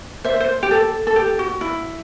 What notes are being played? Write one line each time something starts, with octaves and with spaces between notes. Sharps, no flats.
C5 E5
C5
G4
A4
A4
G4
F#4
E4